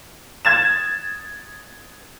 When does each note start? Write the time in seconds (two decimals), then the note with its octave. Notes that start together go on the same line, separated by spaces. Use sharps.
0.45 G#6 A6 E7